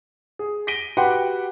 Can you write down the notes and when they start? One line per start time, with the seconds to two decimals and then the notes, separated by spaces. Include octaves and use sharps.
0.39 G#4
0.67 A#6 B6 D7 D#7 G7
0.97 F#4 G4 B4 F#5 G5 C6